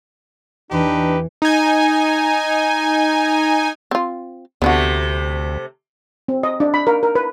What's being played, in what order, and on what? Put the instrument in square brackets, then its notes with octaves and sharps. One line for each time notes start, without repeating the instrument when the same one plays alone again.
[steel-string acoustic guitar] E2 E3 [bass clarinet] D4 [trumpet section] D#4 G4 B4
[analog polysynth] D#4 G#5
[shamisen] C4 F4
[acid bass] D2 [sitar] C3 A3 [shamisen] B3 D4 F#4
[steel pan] C4
D#5
D4
B5
A#4
A#4
B4